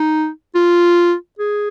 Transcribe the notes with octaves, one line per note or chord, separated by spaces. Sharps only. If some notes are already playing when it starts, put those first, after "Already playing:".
Already playing: D#4
F4
G#4